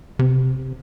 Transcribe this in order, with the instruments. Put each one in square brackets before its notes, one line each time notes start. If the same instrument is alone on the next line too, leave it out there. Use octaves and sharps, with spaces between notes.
[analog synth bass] C3